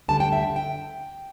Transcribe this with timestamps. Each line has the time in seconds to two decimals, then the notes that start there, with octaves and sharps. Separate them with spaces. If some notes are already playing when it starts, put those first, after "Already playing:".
0.08 D2 D3 G3 A5
0.20 G5
0.32 E5
0.56 G5